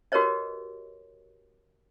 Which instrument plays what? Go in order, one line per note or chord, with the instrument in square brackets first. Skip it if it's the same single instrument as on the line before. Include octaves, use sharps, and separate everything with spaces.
[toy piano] F#4 G4 A#4 B4 C#5 D#5